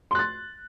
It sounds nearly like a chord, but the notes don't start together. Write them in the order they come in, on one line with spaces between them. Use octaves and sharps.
C6 F#6 A6